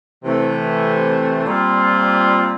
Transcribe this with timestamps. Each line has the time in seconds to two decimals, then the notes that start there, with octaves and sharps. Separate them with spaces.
0.24 C3 E3 A3
1.45 A#2 G3 C4 F4